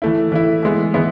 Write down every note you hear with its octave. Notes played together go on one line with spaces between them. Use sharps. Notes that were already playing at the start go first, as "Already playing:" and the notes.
E3 A3 E4
E3 A3 E4
E3 G#3 B3 E4
E3 G#3 B3 E4